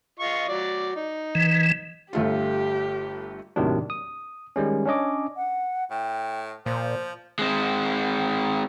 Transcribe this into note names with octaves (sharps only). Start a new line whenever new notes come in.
F4 D#5 C#6
F#3 D5
D#4
E3
G1 A3 F4 G4
D#2 A2 C3 D#3 F#3 D4
D#6
D#3 G3 G#3 C#4
C#4 D4 C#5 D#5 D6
F#5
A2 G5
A#2 F3 C5
G#3 C4